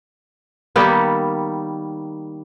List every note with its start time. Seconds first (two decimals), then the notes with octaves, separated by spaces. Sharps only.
0.76 D#3 G3 A#3 B3